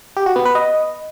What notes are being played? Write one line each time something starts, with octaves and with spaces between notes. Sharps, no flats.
G4
F#4
B3
B4
D#5